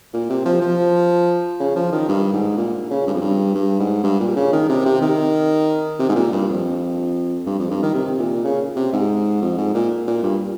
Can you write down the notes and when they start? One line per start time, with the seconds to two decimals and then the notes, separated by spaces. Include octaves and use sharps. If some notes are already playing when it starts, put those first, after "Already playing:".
0.13 A#2
0.30 C3
0.45 F3
0.61 F3
1.60 C#3
1.76 F3
1.92 D#3
2.08 G2
2.33 G#2
2.57 A#2
2.90 C#3
3.07 G2
3.13 F2
3.21 G2
3.55 G2
3.80 G#2
4.04 G2
4.20 A#2
4.36 C#3
4.52 D#3
4.69 C3
4.86 C3
5.01 D#3
5.99 C3
6.09 G#2
6.15 A#2
6.32 G2
6.49 F2
7.46 G2
7.59 F2
7.70 G2
7.82 D#3
7.94 C3
8.19 A#2
8.44 C#3
8.76 C3
8.93 G#2
9.41 F2
9.58 G#2
9.74 A#2
10.07 A#2
10.22 G2